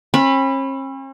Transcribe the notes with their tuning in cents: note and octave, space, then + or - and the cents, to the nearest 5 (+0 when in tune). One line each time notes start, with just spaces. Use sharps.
C#4 -45 B5 +0